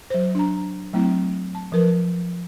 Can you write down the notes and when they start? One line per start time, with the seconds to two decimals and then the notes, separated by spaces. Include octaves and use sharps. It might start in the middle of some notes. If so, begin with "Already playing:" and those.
0.10 F#3 C5
0.35 D4 A#5
0.93 F#3 A3 C4 E4
1.55 A5
1.72 F3 A#4 B4